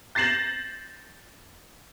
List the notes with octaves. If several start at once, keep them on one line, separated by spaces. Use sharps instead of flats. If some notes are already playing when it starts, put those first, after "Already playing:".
G6 A6 A#6 C7 E7 F#7